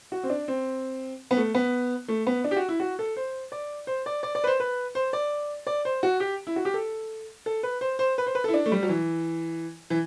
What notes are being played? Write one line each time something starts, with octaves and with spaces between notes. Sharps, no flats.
F#4
C4
D4
C4
B3
A3
B3
A3
B3
D4
G4
F#4
E4
F#4
A4
C5
D5
C5
D5
D5
D5
B4
C5
B4
C5
D5
D5
C5
F#4
G4
E4
F#4
G4
A4
A4
B4
C5
C5
B4
C5
B4
A4
E4
D4
A3
G3
F#3
E3
E3